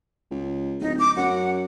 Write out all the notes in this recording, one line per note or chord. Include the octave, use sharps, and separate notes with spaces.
C#2
D1 D#4
D6
F#2 F#5